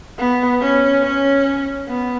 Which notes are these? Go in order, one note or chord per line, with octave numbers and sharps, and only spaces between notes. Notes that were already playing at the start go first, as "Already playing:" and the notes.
B3
C#4
C#4
B3